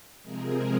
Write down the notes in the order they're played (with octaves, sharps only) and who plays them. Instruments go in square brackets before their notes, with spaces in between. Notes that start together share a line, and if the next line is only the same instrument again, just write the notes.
[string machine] C3 F3 G#3 C4 G#4 A#4